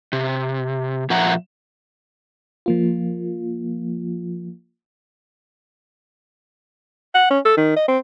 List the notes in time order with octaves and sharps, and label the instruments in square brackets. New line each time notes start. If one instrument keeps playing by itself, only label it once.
[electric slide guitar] C3
A#2 F3 E5 F#5 A#5
[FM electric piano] F3 A#3 F4
[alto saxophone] F#5
C#4
A4
D#3
D#5
C4